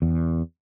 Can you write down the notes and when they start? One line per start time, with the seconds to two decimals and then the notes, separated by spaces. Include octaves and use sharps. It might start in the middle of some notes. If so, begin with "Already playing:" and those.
0.02 E2